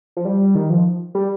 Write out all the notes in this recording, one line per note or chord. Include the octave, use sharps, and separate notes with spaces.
F3
G3
D#3
F3
G3